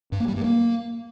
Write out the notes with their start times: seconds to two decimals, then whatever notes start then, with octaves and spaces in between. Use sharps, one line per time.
0.12 G2
0.20 A#3
0.28 G3
0.36 G2
0.44 A#3